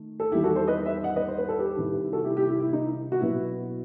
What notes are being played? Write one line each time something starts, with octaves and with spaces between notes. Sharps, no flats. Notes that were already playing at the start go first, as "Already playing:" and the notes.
Already playing: D#3 A3
A4
E2 D#3 G3 E4 G4
F#4 A4
A4 C5
B4 D#5
C5 E5
D#5 F#5
B4 D#5
C5
B4
A4
G4 B4
C2 C3 D#3
F#4 A4
E4 G4
E4 G4
E4
E4
D#4
F#4
B2 F#3 B3 E4